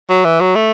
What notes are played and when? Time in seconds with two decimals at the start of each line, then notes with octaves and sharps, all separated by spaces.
0.10 F#3
0.25 E3
0.41 F#3
0.56 A3